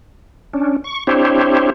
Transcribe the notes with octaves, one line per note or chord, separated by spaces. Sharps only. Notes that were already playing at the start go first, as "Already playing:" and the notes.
C#4 D4
C#6
C4 D4 E4 G4 C5 C#5